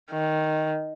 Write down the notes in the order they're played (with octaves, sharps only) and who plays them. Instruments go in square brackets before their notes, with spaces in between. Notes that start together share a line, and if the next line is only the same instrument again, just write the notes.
[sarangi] D#3